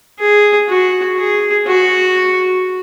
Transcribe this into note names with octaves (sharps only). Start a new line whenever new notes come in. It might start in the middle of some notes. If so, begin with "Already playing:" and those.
G#4
F#4
G#4
F#4